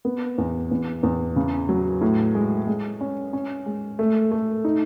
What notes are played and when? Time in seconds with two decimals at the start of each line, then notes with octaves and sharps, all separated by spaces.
0.05 B3
0.38 E2
0.71 E2
1.03 E2
1.36 C#3
1.69 F#3
2.01 A2
2.35 G#3
2.67 G#3
3.01 C#4
3.33 C#4
3.66 G#3
3.99 A3
4.31 A3
4.64 D#4